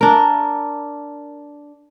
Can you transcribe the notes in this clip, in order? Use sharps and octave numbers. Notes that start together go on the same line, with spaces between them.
D4 A#4